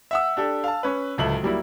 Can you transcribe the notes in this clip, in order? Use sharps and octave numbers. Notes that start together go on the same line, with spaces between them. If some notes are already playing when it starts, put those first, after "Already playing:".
E5 F#5 E6
D4 G4 A4
F5 A5
C#4 B4
D1 C#2 A4 E5 F#7
F#3 G3 A#3 E4